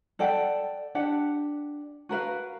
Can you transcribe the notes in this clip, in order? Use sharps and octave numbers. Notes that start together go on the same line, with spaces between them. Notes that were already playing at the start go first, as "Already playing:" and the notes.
A4 D5 F#5 G5
D4 G4 F#5
F#4 A#4 B4 F5